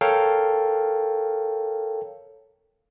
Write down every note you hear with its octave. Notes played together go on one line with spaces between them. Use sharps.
A4 A#4 C#5 F5 G5